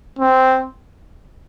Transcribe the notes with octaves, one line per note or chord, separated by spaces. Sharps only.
C4